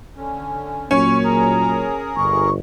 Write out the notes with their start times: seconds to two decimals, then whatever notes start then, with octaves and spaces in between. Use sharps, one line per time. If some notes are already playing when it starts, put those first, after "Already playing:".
0.17 D3 C#4
0.91 A#2 F#3 A#3 C#4 C#6
1.23 G#4 A#4 A#5
2.16 G1 C#6